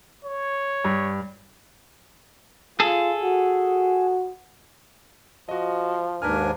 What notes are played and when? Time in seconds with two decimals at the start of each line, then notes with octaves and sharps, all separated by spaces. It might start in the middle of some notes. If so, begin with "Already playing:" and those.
0.25 C#5
0.85 G2
2.80 F4 G#4 A4
3.23 F#4
5.49 F3 F#4 D#5
6.22 D#2 G#2 D4 A#4 B4 G#5 F6